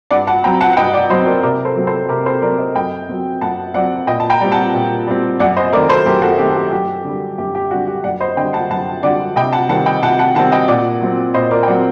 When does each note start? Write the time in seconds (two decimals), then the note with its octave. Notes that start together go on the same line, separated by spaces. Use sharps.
0.11 G2 D5 F#5
0.27 F#5 A5
0.44 F#3 C4 G5 A#5
0.61 F#5 A5
0.73 F#5
0.77 G2 D#5 G5
0.93 D5 F#5
1.10 F#3 C5 D#5
1.13 C4
1.26 A#4 D5
1.43 C3 A#4 D5
1.65 A4 C5
1.76 F#3 C4
1.87 A4 C5
2.09 C3 G4 A#4
2.26 A4 C5
2.42 F#3 C4 A#4 D5
2.58 C5 D#5
2.75 F#2 D#5 G5
3.09 F#3 C4
3.41 F#2 F#5 A5
3.74 F#3 C4 D5 F#5
4.07 A#2 D#5 G5
4.20 A5
4.30 G5 A#5
4.41 G3 C4
4.52 F#5 A5
4.73 A#2
5.07 G3 C4
5.40 F#2 D5 F#5
5.56 C5 D#5
5.72 A3 A#4 D5
5.77 D#3
5.89 A4 C5
6.06 F#2 G4 A#4
6.22 F#4 A4
6.38 D#3 A3 G4
6.50 A4
6.55 G4
6.72 F#2 G4
7.04 D3 G3
7.38 F#2 G4
7.55 G4
7.71 D3 G3 F#4
7.87 G4
8.04 F#2 D5 F#5
8.20 C5 D#5
8.37 D3 D#5 G5
8.41 G3
8.53 F#5 A5
8.70 F#2 F#5 A5
9.03 D3 G3 D5 F#5
9.36 C3 D#5 G5
9.53 F#5 A5
9.69 D#3 G3 C4 F#5 A5
9.86 D#5 G5
10.02 C3 F#5 A5
10.19 F#5 A5
10.35 D#3 G3 C4 F#5 A5
10.52 D#5 G5
10.68 A#2 D5 F#5
11.01 F#3 C4
11.34 A#2 C5 D#5
11.51 A#4 D5
11.63 G5
11.67 F#3 C4 D5 F#5